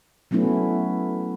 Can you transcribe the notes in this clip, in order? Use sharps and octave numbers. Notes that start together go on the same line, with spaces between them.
F#3 A3 B3 C#4 E4